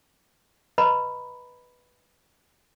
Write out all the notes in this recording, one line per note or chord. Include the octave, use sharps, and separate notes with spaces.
B4 D#5 A#5 B5